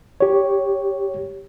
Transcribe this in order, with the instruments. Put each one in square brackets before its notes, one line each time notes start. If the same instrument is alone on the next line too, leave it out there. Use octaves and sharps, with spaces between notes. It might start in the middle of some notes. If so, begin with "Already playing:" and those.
[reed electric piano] G4 C#5